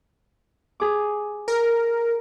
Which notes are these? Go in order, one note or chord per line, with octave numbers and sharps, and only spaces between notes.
G#4 D6
A#4